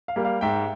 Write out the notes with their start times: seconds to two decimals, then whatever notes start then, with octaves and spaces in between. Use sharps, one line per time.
0.08 F5
0.16 G3 A#3
0.25 F5
0.41 G#2 E5 G5